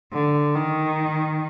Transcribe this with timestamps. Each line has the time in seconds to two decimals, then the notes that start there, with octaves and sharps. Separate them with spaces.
0.13 D3
0.56 D#3